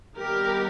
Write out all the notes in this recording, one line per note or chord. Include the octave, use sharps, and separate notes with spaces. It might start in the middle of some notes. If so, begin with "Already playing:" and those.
D#3 G3 B3 G4 A#4